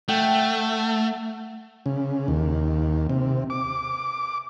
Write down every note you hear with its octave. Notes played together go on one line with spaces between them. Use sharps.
A3 F#5 G5
C#3
D#2
C3
D6